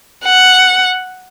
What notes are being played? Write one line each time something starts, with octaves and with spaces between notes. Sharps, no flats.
F#5